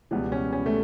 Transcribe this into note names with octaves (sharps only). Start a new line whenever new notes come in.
C#2 B2 E3 G3 B3
C#4
C#4
A3